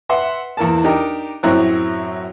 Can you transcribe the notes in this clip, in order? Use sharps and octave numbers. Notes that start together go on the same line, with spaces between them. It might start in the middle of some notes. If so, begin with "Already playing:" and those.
B4 E5 F#5 C6
E2 E3 A#3 A5
D4 D#4 G4 A#4
F#2 A2 F#3 C4 E4 F#6